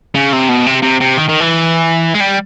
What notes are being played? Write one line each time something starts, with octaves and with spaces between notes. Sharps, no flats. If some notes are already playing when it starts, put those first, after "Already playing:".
C#3
C3
B2
C3
C3
C3
D#3
D#3
E3
G#3
G3